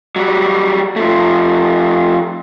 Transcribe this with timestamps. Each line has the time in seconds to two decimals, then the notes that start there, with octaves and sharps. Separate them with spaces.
0.16 F#3 G3
0.96 F3 A3